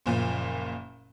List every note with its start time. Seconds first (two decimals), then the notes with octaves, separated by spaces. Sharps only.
0.06 F#1 A#2 F3